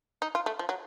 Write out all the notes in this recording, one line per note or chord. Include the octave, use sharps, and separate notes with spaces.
D#4
F4
A3
F3
F#3